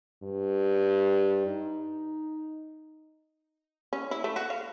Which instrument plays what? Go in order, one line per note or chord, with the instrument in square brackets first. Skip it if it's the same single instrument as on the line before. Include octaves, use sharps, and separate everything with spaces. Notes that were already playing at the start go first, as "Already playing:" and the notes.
[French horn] G2
D#4
[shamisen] C#4
E4
A3
F#4
F5